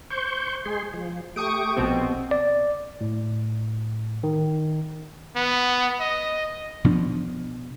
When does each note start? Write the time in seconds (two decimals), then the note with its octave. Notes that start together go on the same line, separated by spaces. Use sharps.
0.10 C5 C#6 G6
0.65 G#3 G#4 C6
0.94 F3
1.36 A3 G4 C#6 D#6 D7
1.77 A#1 B2 C4
2.31 D5
3.01 A2
4.23 D#3
5.36 B3
6.00 D#5
6.84 B2 F3 D4